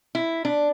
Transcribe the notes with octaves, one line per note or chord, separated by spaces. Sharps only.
E4
D4